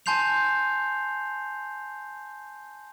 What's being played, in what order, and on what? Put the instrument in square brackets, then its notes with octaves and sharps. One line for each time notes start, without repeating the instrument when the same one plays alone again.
[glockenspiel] G#5 A5 C6 G6 C7 F7